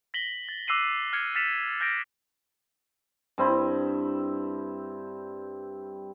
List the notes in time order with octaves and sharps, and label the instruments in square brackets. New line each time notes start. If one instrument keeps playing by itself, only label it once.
[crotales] A#6 B6 F#7 G7
A6
D6 E6 F#6 C7 D#7 F#7
F6 G#6 C#7
F6 A6 B6 C#7 E7 F7
F6 G6 A6 A#6 D7
[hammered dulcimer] G2 C4 E4